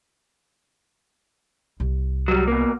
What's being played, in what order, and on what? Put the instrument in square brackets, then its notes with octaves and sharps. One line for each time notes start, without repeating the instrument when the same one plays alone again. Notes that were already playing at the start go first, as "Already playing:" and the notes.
[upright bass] C2
[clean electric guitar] F#3 G3
B2 A#3